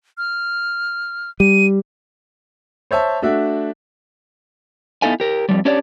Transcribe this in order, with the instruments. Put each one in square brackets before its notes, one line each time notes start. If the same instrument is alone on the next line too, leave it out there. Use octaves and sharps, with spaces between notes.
[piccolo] F6
[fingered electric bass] G3 [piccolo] D#7
[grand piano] C5 C#5 E5 A5
A3 D4 F#4 E5
[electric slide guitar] B3 D#4 E4 A4 F5 G#5
G4 A#4
F2 C3 F3 G3
C#4 D4 G4 C#5 D5